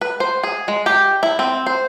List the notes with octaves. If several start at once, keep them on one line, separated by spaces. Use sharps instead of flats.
B4
C5
G#4
G#3
G4
E4
C4
C5